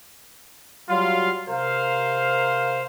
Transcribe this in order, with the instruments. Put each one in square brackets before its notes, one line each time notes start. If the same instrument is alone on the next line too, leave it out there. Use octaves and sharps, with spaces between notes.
[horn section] F#3 G3 F4 F5 C6
C3 A#4 C5 F5